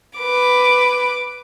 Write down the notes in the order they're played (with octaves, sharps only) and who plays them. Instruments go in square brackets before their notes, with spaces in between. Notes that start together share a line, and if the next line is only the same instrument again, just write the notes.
[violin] B4 D6